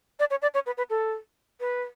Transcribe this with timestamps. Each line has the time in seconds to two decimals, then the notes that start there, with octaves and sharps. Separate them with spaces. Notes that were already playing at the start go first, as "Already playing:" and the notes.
0.20 D5
0.31 C#5
0.42 D5
0.54 C#5
0.66 B4
0.78 B4
0.90 A4
1.60 B4